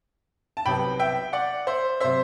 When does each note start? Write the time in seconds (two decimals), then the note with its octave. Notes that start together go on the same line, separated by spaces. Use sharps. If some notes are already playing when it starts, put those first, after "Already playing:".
0.57 A5
0.66 C2 C3 F#3 B3 G5 B5
0.99 E5 G5
1.33 D5 F#5
1.67 C5 E5
2.00 C3 F#3 C5 E5